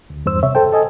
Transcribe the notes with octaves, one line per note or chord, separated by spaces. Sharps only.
D2
E2 G2 C5 E6
C3 C#5 E5
A4 C5 G5
A4 D#5 G#5